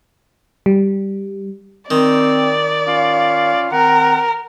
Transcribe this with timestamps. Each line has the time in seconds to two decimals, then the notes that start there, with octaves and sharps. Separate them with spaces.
0.66 G3
1.91 D#3 C4 D5
2.87 C#4 F4 F5
3.72 D#3 C4 A#4 F#5